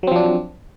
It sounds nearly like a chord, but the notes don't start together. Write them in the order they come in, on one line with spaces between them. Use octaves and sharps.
F#3 C4 F3 D4